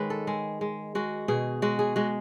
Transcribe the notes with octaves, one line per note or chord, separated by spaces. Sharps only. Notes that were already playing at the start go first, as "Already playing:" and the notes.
Already playing: D#3 G#3 B4 C#5
A4
G#3 G#4
G#3
G#3 F#4
B2 G#4
G#3 F#4
G#4
G#3 F#4